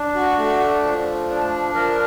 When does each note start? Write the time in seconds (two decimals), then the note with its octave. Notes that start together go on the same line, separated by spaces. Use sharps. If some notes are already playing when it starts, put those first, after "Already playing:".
Already playing: D4
0.15 F#4
0.38 A3 F#4
0.84 F3
1.30 D4
1.75 F3 A#4